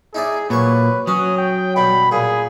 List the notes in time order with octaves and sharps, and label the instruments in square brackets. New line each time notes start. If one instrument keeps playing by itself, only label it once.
[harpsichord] D#4 E4 D5 [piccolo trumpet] G#4
[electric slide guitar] A#2 [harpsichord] F#3 C#6 [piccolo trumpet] B4
[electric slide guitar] F#3 [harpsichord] C#4 [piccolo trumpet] D#6
[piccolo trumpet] G5
[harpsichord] G2 B2 [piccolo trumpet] B5
[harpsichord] A#2 [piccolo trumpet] G#4